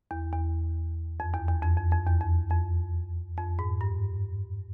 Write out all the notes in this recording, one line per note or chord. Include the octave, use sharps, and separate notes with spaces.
E2
E2
F2
E2
E2
F2
F2
F2
E2
F2
F2
F2
G#2
G2